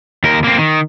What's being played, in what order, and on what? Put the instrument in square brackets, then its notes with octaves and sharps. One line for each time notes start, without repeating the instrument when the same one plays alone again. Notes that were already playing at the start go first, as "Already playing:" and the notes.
[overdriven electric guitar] D#2 A#4
A#3 C4
D#3